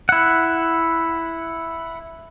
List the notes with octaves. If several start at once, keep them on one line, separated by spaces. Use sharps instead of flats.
E4 F#5